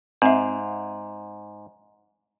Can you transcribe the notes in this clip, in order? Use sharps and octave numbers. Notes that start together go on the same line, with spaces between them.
G#2 C4 E5